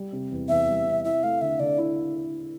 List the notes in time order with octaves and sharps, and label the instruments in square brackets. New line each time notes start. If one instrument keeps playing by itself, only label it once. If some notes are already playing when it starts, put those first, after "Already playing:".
Already playing: [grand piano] G3
C3
E2
[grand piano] E2 [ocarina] E5
[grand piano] G3
C3
[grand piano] E4 [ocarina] E5
[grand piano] A3 [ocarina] F5
[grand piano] D3 [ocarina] E5
[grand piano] D3 [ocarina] D5
[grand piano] E4